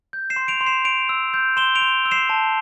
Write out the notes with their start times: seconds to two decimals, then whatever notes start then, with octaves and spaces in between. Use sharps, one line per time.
0.13 G6
0.30 C7 E7
0.36 C6
0.48 D7 F7
0.61 C6
0.66 C7 E7
0.85 C6 D7 F7
1.09 E6
1.34 G6
1.57 C6 E7 G7
1.75 D7 F7
1.82 C6
2.05 E6
2.11 C7 E7
2.30 A5